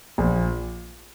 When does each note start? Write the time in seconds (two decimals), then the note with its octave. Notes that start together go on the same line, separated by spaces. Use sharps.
0.18 A#1